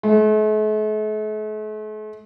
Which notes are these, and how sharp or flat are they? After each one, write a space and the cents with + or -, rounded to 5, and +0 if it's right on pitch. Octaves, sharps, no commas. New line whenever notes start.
A3 -45